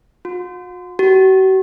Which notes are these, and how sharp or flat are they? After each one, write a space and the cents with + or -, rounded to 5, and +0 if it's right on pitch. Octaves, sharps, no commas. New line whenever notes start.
F#4 -45
F#4 +45